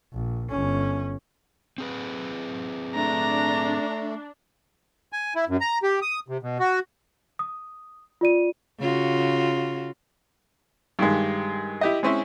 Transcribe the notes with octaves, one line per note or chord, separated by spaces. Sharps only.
A#1
G1 C#4
C4 G#4 B4
A3 D4 A#5
G#5
E4
F#2
A#5
G4
D#6
C3
B2
F#4
D#6
F4 D5 D#7
C#3 F4 F#4
G2 D#3 G#3
E4 G4 D#5
G#3 C4 C#4 E4 C5